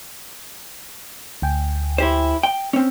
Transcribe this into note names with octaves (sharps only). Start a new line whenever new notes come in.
D2 G5 G#5
E4 G4 C5
G5
C4 C#4